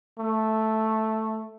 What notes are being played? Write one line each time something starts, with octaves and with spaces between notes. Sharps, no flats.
A3